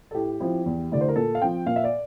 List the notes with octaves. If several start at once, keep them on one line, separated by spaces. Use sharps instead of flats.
A4
A2 G4
F3 C4 E4
E2
D3 A3 E4 D5
C5
A#4
A#2 A4
F5
F3 C4 G5
A#2 F5
E5
D5